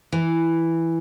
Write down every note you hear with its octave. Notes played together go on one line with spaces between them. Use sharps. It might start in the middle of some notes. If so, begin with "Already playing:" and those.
E3